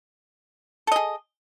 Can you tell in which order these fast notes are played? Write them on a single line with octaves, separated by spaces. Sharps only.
A4 D#5 G#4